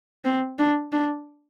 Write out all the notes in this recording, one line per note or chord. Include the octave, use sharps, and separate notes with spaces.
C4
D4
D4